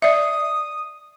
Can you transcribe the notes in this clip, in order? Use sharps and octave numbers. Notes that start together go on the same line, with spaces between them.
D5 E5 D#6